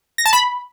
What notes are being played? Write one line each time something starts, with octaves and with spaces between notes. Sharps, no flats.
A#6
A5
B5